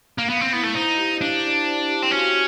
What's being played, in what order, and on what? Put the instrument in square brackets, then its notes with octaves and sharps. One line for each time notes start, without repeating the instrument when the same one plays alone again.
[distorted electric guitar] A#3
[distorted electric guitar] B3 [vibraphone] F5
[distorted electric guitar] C4
[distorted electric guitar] B3 [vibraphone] E4
[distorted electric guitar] A3
[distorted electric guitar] D#4 [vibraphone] C5
[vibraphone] G4
[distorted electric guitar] D4 [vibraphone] F5
[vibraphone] E4
C5
G4
[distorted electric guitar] C4
[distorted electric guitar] C#4 [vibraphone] F#4